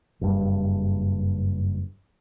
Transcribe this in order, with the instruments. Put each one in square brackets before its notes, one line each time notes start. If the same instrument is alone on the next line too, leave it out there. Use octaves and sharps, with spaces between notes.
[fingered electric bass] F#1 G2